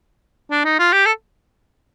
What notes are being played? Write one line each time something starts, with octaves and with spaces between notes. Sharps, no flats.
D4
D#4
F4
G4
A4